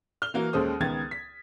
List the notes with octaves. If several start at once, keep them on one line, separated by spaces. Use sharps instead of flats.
F6 G7
E3 A#3 F#4
D#2 G#3 C#4 A4 C5 D#6
C#2 D#3 B3 G#6 A6
B6